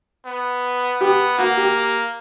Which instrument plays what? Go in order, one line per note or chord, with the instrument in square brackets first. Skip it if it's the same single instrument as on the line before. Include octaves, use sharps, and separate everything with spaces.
[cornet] B3
[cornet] B3 [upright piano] G4
[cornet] A#3 [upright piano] F#4
[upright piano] G4